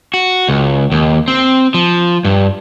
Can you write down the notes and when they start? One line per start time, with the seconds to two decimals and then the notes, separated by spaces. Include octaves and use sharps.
0.14 F#4
0.48 C#2
0.92 D#2
1.28 C4
1.74 F3
2.25 G2